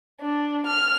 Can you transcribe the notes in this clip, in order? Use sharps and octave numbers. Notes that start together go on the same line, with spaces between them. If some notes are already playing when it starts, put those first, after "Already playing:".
D4
F6